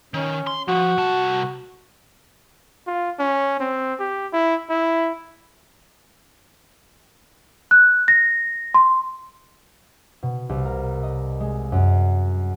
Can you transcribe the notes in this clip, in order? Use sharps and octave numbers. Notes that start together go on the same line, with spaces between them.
D#3 C#4
C6
F3 F#4
C2 A5
F4
C#4
C4
G4
E4
E4
F#6
A#6
C6
B2
C2
A#4
D#5
G#3
F#2